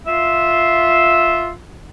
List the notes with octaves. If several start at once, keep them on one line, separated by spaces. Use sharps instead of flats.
F4 E5